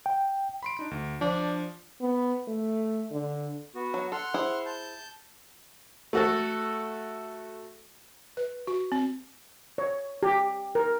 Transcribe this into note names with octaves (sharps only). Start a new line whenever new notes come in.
G5
B5 C6 D7
D4 D#4 D7
D2
F3 D4
B3
A3
D3
B3 F#4
F#3
A4 F#5 C6 F6
E4 G#4 C5
A5 G6
A3 F#4 A4
B4
F#4
C4
C#5
G4
A#4